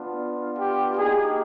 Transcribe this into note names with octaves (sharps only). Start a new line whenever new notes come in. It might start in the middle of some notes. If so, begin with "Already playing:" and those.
Already playing: B3 D4 F4
G4
A#3 D#4 G4 G#4